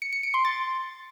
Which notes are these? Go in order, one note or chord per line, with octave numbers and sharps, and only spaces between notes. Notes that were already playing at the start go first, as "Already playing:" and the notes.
C#7
C#7
D7
C6
A6